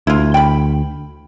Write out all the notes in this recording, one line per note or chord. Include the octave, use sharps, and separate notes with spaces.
D2 E4 F4
G5 B5